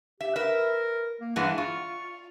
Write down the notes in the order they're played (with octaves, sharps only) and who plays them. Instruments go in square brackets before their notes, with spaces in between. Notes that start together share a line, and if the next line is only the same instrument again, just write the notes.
[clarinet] G4 [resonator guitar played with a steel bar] E5
[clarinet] A#4 [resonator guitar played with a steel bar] B4 E5
[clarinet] A#3
[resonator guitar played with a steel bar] G2 E3 G#3 [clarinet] F#5
[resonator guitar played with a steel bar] F4 [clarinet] C#6